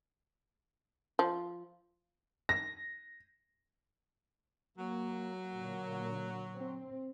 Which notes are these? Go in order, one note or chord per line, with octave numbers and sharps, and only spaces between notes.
F3
A#6
F#3 A#3
A#2 D3 A#3
C4